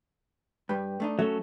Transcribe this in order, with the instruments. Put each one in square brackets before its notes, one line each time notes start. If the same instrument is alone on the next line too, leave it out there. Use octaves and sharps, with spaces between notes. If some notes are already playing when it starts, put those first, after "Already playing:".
[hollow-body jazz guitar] G2 G3 [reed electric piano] B4 G5
[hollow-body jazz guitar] A3 D4 D#4
[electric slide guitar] F#3 A4 [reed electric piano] A3 [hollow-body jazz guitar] C#4